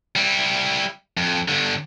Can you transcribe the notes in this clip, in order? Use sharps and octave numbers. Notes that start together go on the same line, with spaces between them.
G3 E4
F2
G2 D3